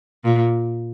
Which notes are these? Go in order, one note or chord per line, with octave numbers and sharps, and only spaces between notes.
A#2